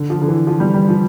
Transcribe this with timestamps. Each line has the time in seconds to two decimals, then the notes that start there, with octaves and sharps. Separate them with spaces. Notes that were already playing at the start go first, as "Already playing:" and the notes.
Already playing: D3
0.10 F3
0.22 D3
0.28 E3
0.47 F3
0.60 G3
0.74 G3
0.89 F3